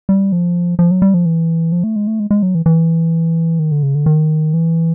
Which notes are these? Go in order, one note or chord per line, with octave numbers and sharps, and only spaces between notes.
G3
F3
F3
F#3
G3
F3
E3
F3
A3
G#3
A3
G#3
G#3
F#3
E3
E3
D#3
D3
C#3
D3
D#3
E3